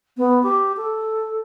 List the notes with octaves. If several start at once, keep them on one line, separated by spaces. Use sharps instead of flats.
B3
G4
A4